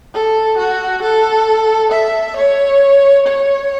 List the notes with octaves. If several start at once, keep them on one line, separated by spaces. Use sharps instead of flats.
A4
F#4
A4
E5
C#5
C#5